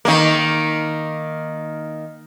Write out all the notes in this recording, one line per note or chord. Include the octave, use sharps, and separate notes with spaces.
D#3 A#3